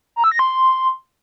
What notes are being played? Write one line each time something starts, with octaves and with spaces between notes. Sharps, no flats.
A#5
E6
A#6
C6